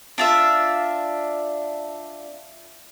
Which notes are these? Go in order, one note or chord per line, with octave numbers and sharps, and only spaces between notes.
D4 F4 E5